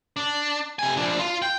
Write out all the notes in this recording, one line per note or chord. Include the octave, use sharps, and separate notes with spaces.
D4
C3 G#5
F3 D4
F4
G5